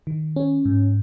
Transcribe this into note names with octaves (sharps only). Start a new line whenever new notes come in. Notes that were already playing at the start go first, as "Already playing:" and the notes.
D#3
C#4
G#2